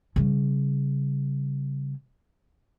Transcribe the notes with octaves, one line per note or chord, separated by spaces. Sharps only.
C#3 G3